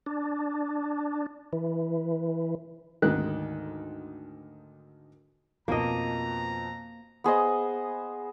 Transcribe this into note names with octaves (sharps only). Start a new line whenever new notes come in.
D4
E3
D2 G#2 D#3 D#4 F#6
F2 B2 F3 A#3 D#5 A#5
B3 G#4 C5 D#5